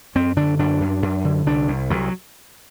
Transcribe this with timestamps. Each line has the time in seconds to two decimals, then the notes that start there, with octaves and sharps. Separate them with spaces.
0.15 F#2 C4
0.37 D3 D4
0.59 F#2 D4
0.80 F#2
1.02 F#2
1.24 D3
1.46 C2 D4
1.68 C2
1.90 C2 F#3